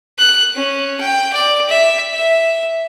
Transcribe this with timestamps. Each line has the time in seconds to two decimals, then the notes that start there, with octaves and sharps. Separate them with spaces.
0.19 F#6
0.55 C#4
1.00 G5
1.33 D5
1.69 E5
2.13 E5